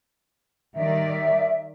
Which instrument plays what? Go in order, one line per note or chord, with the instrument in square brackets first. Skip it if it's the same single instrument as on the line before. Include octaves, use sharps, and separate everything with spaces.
[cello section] D#3 G3 D5 [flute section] E5